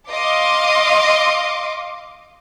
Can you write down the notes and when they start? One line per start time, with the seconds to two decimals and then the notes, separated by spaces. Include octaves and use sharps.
0.10 D#5 F5 C6 D6